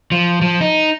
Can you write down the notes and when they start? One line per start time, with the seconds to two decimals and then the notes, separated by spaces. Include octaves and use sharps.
0.12 F3
0.42 F3
0.61 D#4